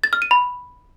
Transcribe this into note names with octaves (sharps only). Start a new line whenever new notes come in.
A6
F6
D#7
B5